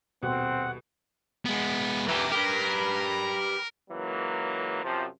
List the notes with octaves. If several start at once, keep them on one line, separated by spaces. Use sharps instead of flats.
D#1 B2 C4 F#5
G#3 B3
E3 G4 A#4 E5
G4 A#4 B4
C#2 E3 F#3 A#3
F#2 C3 F3